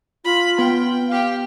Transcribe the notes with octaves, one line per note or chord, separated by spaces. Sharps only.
F4 B5
B3 G5
G4 F5 G5